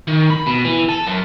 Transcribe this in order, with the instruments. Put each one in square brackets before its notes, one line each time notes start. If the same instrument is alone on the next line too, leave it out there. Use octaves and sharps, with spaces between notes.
[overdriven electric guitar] D#3
B5
B2
E3
A4
F#2